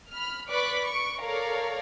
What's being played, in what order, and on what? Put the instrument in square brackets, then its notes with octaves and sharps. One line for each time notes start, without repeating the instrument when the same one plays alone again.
[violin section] B5 F6
B4 D5 B5 C#6 D6 F#6
C#6 D7
A4 A#4 C#5 D5 F5 A#5